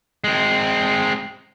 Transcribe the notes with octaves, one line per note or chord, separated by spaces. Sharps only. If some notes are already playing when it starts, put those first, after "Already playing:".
G#3 C4